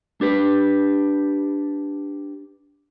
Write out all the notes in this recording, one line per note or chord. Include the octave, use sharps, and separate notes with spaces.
D4 G4 B4